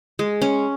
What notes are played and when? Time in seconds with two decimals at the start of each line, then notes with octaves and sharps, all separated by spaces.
0.19 G#3
0.42 C#4